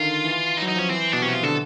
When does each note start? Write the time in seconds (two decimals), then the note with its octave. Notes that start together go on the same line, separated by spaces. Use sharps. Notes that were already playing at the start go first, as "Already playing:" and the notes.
Already playing: D3 D#3 F4
0.24 E3
0.57 D#4
0.62 F#3
0.68 D#4
0.76 F3 C#4
0.90 E3 C4
1.12 B2 D4
1.22 C3 C#4
1.28 F#4
1.33 F4
1.43 D3 A4